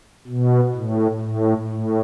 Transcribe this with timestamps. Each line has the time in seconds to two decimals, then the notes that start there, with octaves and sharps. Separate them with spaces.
0.27 B2
0.74 A2
1.21 A2
1.68 A2